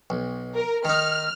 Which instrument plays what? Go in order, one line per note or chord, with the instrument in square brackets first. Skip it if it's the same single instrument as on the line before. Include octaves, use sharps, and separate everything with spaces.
[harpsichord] B1
[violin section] A#4
[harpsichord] D#3 D#4 [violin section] F6